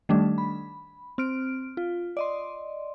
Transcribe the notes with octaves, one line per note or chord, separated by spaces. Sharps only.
D#3 G3 A3 D4
B5
C4 F6 D7
F4
D5 D#5 C6